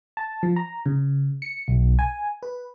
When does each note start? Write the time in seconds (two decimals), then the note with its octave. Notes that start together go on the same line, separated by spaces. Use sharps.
0.17 A5
0.43 F3
0.56 A#5
0.86 C#3
1.42 C#7
1.68 B1
1.99 G#5
2.43 B4